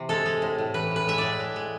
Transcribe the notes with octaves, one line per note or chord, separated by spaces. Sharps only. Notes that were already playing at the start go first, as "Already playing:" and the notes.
Already playing: C3 E3
G#3 A4
G#3
A2
A2
E3 B4
A2 B4
G#3 E5
D5
A2
G#3
G#3